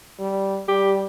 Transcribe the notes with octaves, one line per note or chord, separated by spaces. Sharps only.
G3
G3 G4